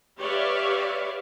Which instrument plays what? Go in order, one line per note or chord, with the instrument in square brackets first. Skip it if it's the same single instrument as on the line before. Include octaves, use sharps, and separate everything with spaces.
[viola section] G4 B4 C#5 D5 E5 F5